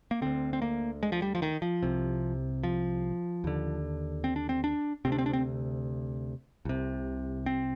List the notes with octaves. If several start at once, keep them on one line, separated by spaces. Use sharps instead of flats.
A#3
D2 D3 C4
C4
A#3
G#3
F3
G3
F3
D#3
F3
C2 C3
F3
D#2 D3
C4
D4
C4
D4
D2 C3 C4
D4
C4
D4
C4
C2 C3
C4